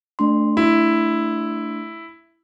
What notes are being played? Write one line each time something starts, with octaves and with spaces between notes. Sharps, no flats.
A3 D4 C6
E4